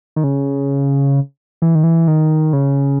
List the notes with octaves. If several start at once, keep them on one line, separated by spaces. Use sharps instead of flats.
D#3
C#3
E3
D#3
E3
D#3
C#3